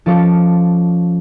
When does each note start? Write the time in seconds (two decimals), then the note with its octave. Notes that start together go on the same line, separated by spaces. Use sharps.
0.06 F3 C#4 A4 F5 D6 C#7